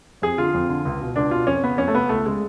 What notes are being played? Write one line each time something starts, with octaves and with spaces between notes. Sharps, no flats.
F2 G#4
D3 F4
F2
D3
C#2
B2
C#2 D4
B2 F4
F2 C#4
C#3 B3
F2 C#4
A3
C#3 B3
C#2 A3
C#3 G#3